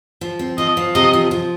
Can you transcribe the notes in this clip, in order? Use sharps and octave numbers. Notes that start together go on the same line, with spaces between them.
F3
C4
F3 D#5
F3
C3 D#5
F3
F3